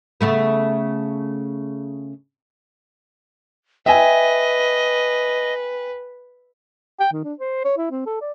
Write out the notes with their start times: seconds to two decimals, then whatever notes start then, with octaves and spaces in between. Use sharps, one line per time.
0.21 C#3 A3 B3
3.86 B4 D#5 E5 G5 G#5
7.00 G5
7.12 D#3
7.24 D4
7.39 C5
7.64 C#5
7.77 E4
7.91 C4
8.06 A4
8.21 D5